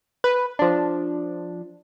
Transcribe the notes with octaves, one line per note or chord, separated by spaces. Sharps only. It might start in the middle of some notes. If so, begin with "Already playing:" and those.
B4
F3 D4